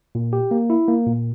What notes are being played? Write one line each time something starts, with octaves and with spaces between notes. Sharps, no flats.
A#2
G4
A#3
E4
A#3
A#2